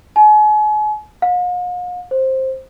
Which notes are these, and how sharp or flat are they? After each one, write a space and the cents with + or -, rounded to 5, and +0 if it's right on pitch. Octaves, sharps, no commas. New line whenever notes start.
G#5 +40
F5 +45
C5 +10